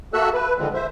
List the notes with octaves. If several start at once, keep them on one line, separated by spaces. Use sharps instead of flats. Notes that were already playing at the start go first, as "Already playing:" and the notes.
A#3 F#4 A4 E5 E6 F#6
B4
D3 D#3 F3 G#3 C4
C5 E5